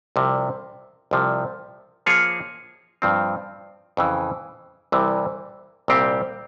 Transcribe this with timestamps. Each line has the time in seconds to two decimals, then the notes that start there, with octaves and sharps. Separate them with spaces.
0.16 C2 C3 F3
1.11 C2 C3 F3
2.06 F3 A#3 F4 G#4 C#5
3.02 G2 F3 C4
3.97 F2 C#3 E3
4.92 C2 C3 E3 G3
5.88 C2 A#2 G3 C4 G4